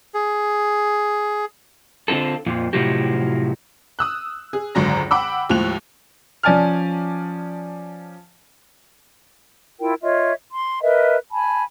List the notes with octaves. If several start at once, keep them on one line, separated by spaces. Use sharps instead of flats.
G#4
D3 C4 D#4 F4 A4
F2 A#2 F3
A2 C3 F3 F#3 F#4 G4
D#6 E6 F#6
G#4
G#1 C#2 F#2 D3 A#5 A#6
F#5 G5 B5 D6 E6
D#2 A2 F3 G#3 F#6 F7
F3 C#4 D5 G#5 A5 F6
E4 F4 A#4 G5
F4 C#5 D#5 E5
C6
A#4 B4 D#5 E5
G#5 A5 B5